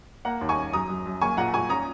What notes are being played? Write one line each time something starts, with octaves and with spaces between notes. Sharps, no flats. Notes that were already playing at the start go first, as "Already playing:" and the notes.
A#3 F#5 A#5
D#2
G#5 C#6
C#4
F#2 A#5 D#6
F#2
F#2
A#3 G#5 C#6
A#2 F#5 A#5
A#2 G#5 C#6
C#4 A#5 D#6